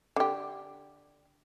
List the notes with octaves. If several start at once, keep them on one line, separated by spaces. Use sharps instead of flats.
D3 G4